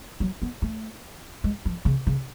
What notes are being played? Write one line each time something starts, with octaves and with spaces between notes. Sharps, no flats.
F#3
B3
A3
G#3
F3
C#3
C#3